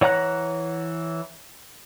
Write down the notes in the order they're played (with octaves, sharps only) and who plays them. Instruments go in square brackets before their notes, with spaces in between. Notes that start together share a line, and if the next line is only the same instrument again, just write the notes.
[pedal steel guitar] E3 C#5 F#5 A#5 F#6